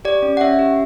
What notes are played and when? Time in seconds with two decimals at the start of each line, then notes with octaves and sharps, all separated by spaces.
0.05 G4 D5
0.22 C#4
0.37 F#5
0.41 C#4 E5
0.59 G4